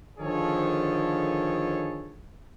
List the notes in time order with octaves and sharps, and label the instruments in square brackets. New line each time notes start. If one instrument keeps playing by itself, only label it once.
[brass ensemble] D3 D#3 F3 G#4 A4 C#5